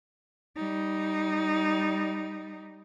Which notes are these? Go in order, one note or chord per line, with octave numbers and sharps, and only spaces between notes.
G3 D#4